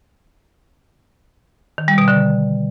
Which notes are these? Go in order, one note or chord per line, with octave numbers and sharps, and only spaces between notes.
D#3
G3
B2
D3